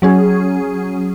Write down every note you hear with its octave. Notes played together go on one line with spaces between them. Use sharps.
F#3 C#4 G#4